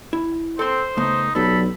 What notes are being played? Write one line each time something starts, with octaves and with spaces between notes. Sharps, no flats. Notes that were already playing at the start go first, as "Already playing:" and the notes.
E4
C4 A4 C5 C6
C#3 A3 B3 D#4
B1 F#3 G3 A4 B5